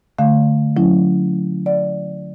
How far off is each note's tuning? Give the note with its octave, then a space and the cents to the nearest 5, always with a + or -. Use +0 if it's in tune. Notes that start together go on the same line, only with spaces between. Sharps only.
D3 +0 A3 +0 F5 +0
F#3 -25 C#4 +0 E4 +0
D5 +0 F#5 +0